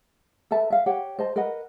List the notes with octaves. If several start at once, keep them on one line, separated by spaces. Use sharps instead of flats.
A4 B4 E5 A5
E5 F5
G4 C#5 F#5
C5 D#5 A5
A#4 B4 D#5 F#5